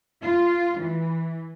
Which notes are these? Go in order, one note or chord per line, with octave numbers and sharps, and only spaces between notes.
F4
E3